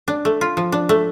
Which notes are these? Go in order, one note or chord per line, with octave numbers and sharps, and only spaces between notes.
D4
A3
F4
F3
D4
A3